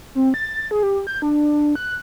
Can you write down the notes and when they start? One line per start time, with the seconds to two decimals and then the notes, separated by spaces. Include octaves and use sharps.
0.15 C4
0.34 A6
0.71 G#4
0.83 G4
1.07 G6
1.22 D4
1.75 F#6